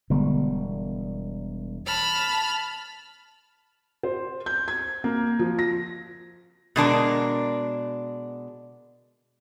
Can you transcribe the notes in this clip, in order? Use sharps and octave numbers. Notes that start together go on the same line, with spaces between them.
E1 D3 G3 G#3 B3
A5 B5 F6
C5
G6
G#6
A#3
F3
A#6
B2 G#3 D4 A#4